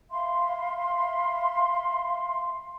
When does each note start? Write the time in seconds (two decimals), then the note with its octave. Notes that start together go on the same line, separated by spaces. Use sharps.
0.10 E5 F5 B5 C6